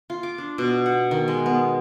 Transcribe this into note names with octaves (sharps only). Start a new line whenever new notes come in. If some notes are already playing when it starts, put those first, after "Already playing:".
F4
D6
D4
B2
F#5
D#3
G#3
B3